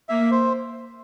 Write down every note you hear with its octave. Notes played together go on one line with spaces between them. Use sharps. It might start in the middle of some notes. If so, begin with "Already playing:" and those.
A#3 E5
C5